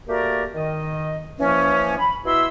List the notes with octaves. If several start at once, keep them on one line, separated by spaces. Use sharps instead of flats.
A3 A#3 F#4 G4 A#4 D5
D#3 D#5
E3 F3 A#3 C#4
B5
B2 E4 E5 C6 E6